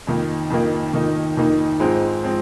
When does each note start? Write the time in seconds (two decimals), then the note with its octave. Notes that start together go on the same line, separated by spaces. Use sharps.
0.07 F2 D#3 A#3 D#4
0.50 F2 D#3 A#3 D#4
0.93 F2 D#3 A#3 D#4
1.37 F2 D#3 A#3 D#4
1.80 G#2 F3 G#3 C4
2.23 F3 G#3 C4